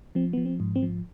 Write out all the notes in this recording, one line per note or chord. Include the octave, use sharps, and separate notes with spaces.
F3 C4
F3 B3
C4
G#2
C4
F3